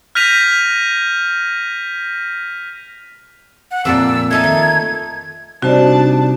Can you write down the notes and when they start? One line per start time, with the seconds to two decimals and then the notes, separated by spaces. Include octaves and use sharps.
0.15 F6 G6 A#6 B6 D#7 F7
3.71 F#5
3.85 F2 A#2 D5 E6
4.31 A3 D#4 A4 G#6
4.44 D#3
5.62 C3 G3 D4 D#4 F#4 C5 D5 A5